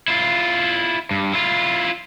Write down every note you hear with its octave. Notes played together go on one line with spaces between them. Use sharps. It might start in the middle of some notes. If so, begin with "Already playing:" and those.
E4 F4
G2
E4 F4